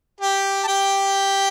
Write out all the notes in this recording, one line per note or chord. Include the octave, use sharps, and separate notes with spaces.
G4 G5
A5
G4 G5